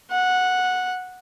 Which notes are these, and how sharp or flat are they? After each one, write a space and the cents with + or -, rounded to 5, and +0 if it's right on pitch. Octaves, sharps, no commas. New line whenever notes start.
F#5 -10